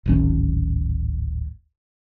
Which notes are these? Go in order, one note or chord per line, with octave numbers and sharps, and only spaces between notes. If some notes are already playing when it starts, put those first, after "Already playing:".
D1 G#1 C#4